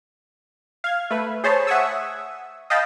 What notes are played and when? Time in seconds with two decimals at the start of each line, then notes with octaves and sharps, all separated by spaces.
0.84 F5 G#6
1.10 A3 B4
1.44 G#4 C5 C#5 A5 B5
1.67 E5 F#5 G#5 C#6 D#6 E6
2.70 D#5 F5 G5 A5 B5